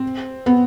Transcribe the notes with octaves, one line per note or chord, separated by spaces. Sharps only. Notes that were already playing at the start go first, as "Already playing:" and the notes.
Already playing: C4
B3